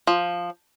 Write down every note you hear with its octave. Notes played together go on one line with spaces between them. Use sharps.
F3